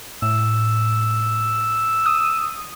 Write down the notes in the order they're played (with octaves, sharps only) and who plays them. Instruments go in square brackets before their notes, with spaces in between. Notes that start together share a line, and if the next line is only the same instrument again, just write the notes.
[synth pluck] A2 [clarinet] E6
[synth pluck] D#6